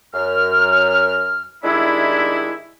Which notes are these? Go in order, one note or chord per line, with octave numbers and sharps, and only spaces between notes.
F#2 F6
D#3 G3 G#3 D4 E4